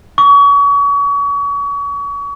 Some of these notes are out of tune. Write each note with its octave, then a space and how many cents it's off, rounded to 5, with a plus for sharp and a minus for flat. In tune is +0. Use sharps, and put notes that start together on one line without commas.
C#6 +35